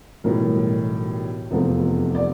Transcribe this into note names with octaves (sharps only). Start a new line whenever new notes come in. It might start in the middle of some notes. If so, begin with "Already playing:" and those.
B1 A2 E3 G3 A#4
F1 E2 C3 F3 A3
D5